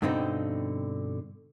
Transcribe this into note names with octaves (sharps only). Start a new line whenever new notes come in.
G2 B2 D3 C4 D#4